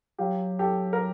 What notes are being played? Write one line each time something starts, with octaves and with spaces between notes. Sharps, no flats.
F#3 F4 G4
G4 A4
A#4